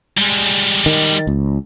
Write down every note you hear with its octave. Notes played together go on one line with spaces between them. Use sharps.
G3 G#3
D#3
C#2